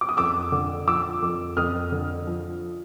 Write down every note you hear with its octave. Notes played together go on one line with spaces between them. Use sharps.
D6
D#6
F2 D6 E6
D3
F3 D6 E6
F2
F2 D#6 F6
D3
F3